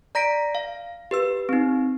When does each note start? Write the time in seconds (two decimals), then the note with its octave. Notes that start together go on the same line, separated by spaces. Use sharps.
0.15 D5 A#5 A#6 B6 D7
0.55 F5
1.11 G4 B4 E6
1.49 C4 D#4